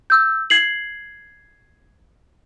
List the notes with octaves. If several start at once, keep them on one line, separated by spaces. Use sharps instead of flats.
E6 G6
G#6 C7 F#7